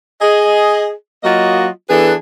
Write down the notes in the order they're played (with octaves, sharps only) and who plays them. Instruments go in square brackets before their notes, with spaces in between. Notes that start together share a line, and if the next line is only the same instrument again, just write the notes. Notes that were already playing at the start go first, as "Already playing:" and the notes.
[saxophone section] G#4 D#5
F#3 A#3 F4 F#4 D#5
E3 B3 D4 G#4 A4 B4